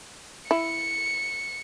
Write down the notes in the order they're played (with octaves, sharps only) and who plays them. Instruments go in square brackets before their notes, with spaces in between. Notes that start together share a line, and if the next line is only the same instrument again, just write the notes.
[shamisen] E4 [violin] C#7